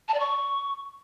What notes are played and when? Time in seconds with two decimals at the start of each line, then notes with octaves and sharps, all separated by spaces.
0.08 A5
0.14 D5
0.20 C#6